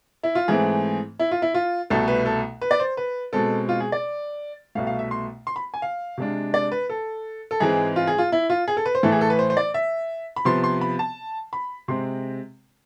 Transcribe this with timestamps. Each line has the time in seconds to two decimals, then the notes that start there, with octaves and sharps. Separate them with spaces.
0.23 E4
0.35 F4
0.48 G#2 E3 A3 C4 G#4
1.19 E4
1.31 F4
1.42 E4
1.54 F4
1.90 C2 B2 A3 A4
2.08 B4
2.26 A4
2.61 B4
2.71 D5
2.80 C5
2.97 B4
3.33 B2 G#3 C4 A4
3.69 F4
3.80 G#4
3.92 D5
4.75 C2 B2 A3 F5
4.87 F5
4.99 E5
5.11 C6
5.47 C6
5.56 B5
5.74 G#5
5.82 F5
6.18 C3 G#3 D4
6.54 D5
6.72 B4
6.90 A4
7.51 A4
7.60 G#2 E3 G#3 C4 G#4
7.96 F4
8.07 G#4
8.18 F4
8.32 E4
8.50 F4
8.68 G#4
8.77 A4
8.86 B4
8.95 C5
9.03 A2 E3 A3 A4
9.12 G#4
9.21 A4
9.30 B4
9.39 C5
9.50 C5
9.57 D5
9.74 E5
10.36 B5
10.45 C3 F3 B3 C6
10.64 C6
10.81 B5
10.99 A5
11.53 B5
11.88 C3 G#3 C4 C6